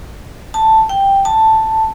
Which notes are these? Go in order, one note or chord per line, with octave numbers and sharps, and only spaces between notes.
A5
G5
A5